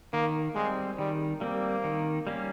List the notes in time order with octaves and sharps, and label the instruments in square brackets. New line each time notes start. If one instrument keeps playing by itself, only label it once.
[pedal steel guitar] D#3 [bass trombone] A#3
[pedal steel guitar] G3 C4 [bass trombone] G#3
[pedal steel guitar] D#3 [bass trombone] G3
[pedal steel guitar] G3 C4 [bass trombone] A#3
[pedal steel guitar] D#3
G3 A#3 C#4